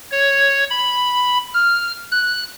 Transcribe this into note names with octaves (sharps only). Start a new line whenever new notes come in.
C#5
B5
F6
F#6